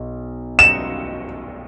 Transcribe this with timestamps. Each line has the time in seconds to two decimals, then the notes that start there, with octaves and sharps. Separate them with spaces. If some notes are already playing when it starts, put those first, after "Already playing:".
Already playing: B1
0.59 E7